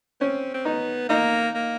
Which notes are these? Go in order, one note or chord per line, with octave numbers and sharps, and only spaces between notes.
C4 C#4
C4
B3 D#4
A#3 D#4
A#3